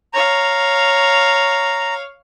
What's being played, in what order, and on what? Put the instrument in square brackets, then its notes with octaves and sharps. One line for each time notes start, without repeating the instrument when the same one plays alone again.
[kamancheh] C#5 F5 [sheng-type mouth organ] A#5